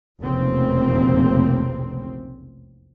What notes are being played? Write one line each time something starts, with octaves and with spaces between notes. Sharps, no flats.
F1 B1 E2 C#3 A#3 C4